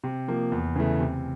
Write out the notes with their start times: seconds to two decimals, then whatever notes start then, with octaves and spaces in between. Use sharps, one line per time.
0.04 C3
0.28 F3 A#3
0.52 E2
0.76 C#3 E3 A3
1.00 C3